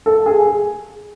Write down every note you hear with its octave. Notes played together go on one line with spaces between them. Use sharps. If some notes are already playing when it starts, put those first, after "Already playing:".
A4
G#4
G#4